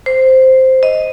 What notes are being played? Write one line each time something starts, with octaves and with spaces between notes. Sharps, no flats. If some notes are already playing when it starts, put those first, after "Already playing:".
C5
D#5